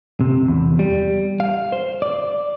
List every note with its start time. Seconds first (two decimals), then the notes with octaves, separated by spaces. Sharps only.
0.21 C3
0.48 E2
0.79 G3
1.40 F5
1.72 C5
2.02 D5